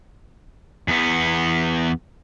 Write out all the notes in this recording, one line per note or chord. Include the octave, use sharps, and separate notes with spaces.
E2 B3